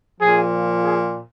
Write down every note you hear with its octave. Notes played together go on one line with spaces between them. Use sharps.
A#2 F3 G#4
G#4